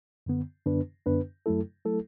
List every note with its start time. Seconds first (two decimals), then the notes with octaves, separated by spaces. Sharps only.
0.26 F#2 D3 B3
0.66 F#2 D3 B3 D4 B4
1.06 F#2 D3 B3 D4 B4
1.46 F#2 F#3 A3 E4 A4
1.85 F#3 A3 E4 A4